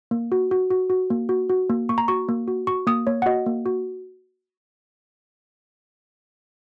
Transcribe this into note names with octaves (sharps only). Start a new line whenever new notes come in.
A#3
F#4
F#4
F#4
F#4
A#3
F#4
F#4
A#3
A#3 C#6
A#5
F#4 C#6
A#3
F#4
F#4 C#6
A#3 D#6
A#3 C#5
F#5
F#4 D#5
A#3
F#4